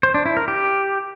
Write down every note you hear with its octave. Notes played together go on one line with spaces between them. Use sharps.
C5
D4
E4
A#4
G4